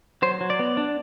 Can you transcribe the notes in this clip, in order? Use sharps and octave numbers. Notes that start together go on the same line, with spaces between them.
F#3 C5
F#3
D5
B3
D4